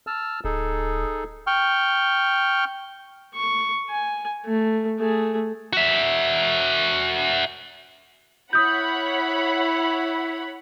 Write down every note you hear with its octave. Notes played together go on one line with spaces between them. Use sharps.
A5 E6 F6
D1 D#4 G#4 A4
G5 C#6 F6
C#6
G#5
A3
A3 G#4
F#4 E5
E4 C#5 F#5 B5 D#6 G6